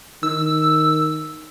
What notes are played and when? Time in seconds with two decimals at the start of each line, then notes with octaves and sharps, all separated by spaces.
0.23 D#3 E6